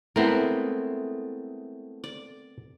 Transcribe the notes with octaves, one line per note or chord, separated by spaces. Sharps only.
G#3 A3 B3 C4 E4 A#4
D5